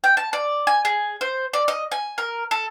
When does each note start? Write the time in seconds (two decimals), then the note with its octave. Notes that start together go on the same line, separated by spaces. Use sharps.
0.04 G5
0.17 A5
0.33 D5
0.67 G#5
0.85 G#4
1.21 C5
1.53 D5
1.68 D#5
1.92 G#5
2.18 A#4
2.51 A4